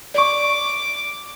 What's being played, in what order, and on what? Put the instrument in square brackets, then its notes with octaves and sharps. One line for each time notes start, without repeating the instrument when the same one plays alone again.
[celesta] D5 C#6 [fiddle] D6